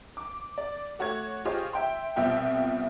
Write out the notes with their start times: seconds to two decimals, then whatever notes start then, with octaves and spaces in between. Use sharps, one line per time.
0.17 D6
0.58 D5
0.99 A3 F#4 C#5 G#6
1.45 F4 G4 G#4 C5 C#5 D#5
1.73 E5 G5 C6
2.16 C2 B2 C4 F4 E5 G5